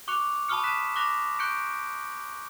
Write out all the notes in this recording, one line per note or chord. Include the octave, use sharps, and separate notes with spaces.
C#6 D6 F#6 C#7 F7
A5 B5 C#6 D#6 F6 C#7
A5 D#6 F#6 B6 E7
C#6 D6 F#6 A#6 F7 G7
C#6 F#6 G6 C#7 D7